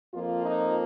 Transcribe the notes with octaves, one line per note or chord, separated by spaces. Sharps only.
F2 F3 A#3 F4
D#4